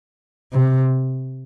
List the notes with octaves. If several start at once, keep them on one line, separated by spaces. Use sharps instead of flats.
C3